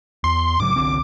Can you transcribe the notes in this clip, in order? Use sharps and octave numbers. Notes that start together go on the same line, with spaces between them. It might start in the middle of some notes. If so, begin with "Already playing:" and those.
E2 C6
G#2 C#3 F#3 D6
C2 D3 C4